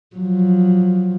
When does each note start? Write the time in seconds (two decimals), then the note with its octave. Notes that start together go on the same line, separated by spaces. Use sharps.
0.16 F3 F#3